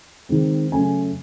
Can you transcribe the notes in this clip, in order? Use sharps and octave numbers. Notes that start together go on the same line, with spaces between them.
D#3 G#3 C4
C#3 F#3 A3 C#4 G#5